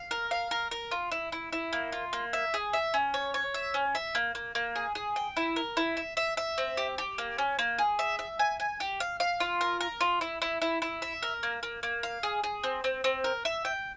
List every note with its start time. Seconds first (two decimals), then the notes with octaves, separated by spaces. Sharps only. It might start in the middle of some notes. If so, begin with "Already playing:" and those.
Already playing: F5
0.11 A#4
0.31 F5
0.51 A#4
0.71 A#4
0.91 F4
1.12 E4
1.32 E4
1.53 E4
1.73 A#3
1.92 F4
2.13 A#3
2.33 E5
2.54 G#4
2.73 E5
2.94 C#4
3.14 C#5
3.34 C#5
3.54 E5
3.74 C#4
3.95 E5
4.15 A#3
4.35 A#3
4.55 A#3
4.76 G#4
4.95 G#4
5.16 G5
5.37 E4
5.56 A#4
5.77 E4
5.97 E5
6.17 E5
6.37 E5
6.58 C4
6.77 G4
6.98 G4
7.18 A#3
7.38 C#4
7.59 A#3
7.78 G#4
7.99 E5
8.19 E5
8.39 G#5
8.60 G#5
8.80 G4
9.00 F5
9.20 F5
9.40 F4
9.61 A#4
9.80 A#4
10.01 F4
10.21 E4
10.42 E4
10.62 E4
10.82 E4
11.02 E5
11.22 A#4
11.43 A#3
11.63 A#3
11.83 A#3
12.03 F5
12.23 G#4
12.44 G#4
12.63 C4
12.84 C4
13.04 C4
13.24 A#4
13.45 E5
13.65 G5